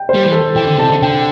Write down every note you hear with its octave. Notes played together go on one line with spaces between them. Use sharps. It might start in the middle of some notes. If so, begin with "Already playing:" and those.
Already playing: G5
C5
G3
E3
A4
E3 G5
D3
C3 A5
D3
D3 G5